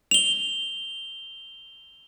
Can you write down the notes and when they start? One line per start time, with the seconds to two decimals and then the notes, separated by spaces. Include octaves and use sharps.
0.11 F7 G7